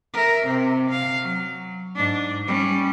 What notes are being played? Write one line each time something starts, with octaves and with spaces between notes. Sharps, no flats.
A#4 E5
C3 C4
F5
F#3
G#2 D4
G3 C#4